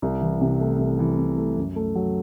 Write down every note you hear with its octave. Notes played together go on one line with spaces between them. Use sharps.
C2
E3
C3
A3
C2
E3
C3
A3
F#2
A3
F#3